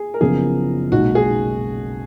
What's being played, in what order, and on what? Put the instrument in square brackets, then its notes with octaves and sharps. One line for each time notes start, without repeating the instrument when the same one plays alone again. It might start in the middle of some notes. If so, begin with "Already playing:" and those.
Already playing: [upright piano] G#4
A#4
[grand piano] F#1 F#2 F3 B3 F4 [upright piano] G#4
[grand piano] B1 A#2 G#3 D#4 [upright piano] F#4
[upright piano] G#4